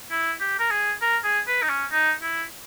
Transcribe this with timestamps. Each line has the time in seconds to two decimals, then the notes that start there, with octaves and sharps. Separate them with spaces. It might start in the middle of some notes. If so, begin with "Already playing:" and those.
0.11 E4
0.40 G4
0.59 A#4
0.71 G#4
1.01 A#4
1.24 G#4
1.47 B4
1.63 D#4
1.70 C#4
1.91 D#4
2.23 E4